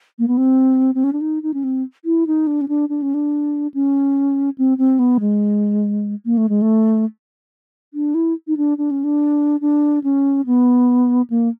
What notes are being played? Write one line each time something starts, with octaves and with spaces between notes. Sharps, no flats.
A#3
B3
C4
C4
C#4
D4
D#4
D#4
C#4
C4
E4
D#4
D4
C#4
D4
D4
C#4
D4
C#4
C4
C4
B3
G#3
A#3
A3
G#3
A3
D4
E4
D#4
D4
D4
C#4
D4
D4
C#4
B3
A#3